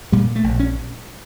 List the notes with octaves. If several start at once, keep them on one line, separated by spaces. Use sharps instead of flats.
A#2 G3
A3
A#1
C#4